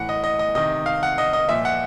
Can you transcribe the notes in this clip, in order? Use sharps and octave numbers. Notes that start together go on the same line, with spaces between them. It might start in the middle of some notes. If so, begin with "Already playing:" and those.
Already playing: A2 E3 F#5
D#5
D#5
D#5
C3 D#3 D#5
F5
F#5
D#5
D#5
A#2 F3 E5
F#5